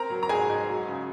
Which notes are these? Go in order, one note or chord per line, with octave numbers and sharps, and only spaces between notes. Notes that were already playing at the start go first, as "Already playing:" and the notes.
Already playing: C4 A#4 A#5
F#3
A#5
G#2 G#4 G#5
G#2
F#3
C#3